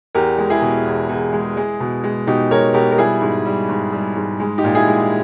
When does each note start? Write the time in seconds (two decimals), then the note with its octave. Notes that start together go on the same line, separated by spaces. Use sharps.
0.15 E2 G4 A#4
0.38 G#3
0.50 E4 G#4
0.62 B2
0.85 E2
1.09 E2
1.33 G#3
1.57 G#3
1.80 B2
2.04 G#3
2.27 B2 D#4 G4
2.51 G#3 A#4 C#5
2.74 B2 G4 A#4
2.92 A#4
2.98 G3 E4 G#4
3.22 G#2
3.46 G3
3.69 G#2
3.93 G3
4.16 G#2
4.40 G#3
4.58 D#4 G4
4.64 A#2
4.75 E4 G#4
4.87 G#3